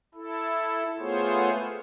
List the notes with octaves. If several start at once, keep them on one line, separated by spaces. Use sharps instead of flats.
E4 A4
A3 B3 F4 G#4 C5 C#5